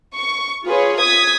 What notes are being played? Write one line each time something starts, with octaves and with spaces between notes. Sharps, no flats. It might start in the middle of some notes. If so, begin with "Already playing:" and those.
C#6
F4 G#4 B4 C#5
D#6 G#6 B6